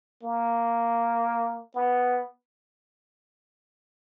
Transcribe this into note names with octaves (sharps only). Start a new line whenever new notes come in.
A#3
B3